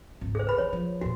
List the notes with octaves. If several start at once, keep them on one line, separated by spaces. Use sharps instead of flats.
G#1 C#2
G#4 C5
B4 B5
E3 C#5
F3
D#2 A#2 F#4